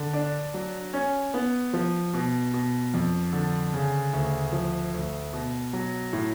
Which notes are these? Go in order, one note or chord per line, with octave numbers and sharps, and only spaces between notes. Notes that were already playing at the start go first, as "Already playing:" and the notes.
Already playing: D3
D4
F#3
C#4
B3
F3
B2
B2
F2
D3
C#3
D2
F3
D2
B2
F#3
A2